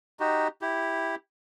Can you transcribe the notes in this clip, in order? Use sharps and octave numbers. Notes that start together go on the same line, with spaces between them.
D#4 F#4 G4
E4 G4